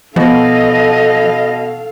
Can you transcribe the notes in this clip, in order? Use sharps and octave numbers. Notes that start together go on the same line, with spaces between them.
B2 F3 A4 D#5 F5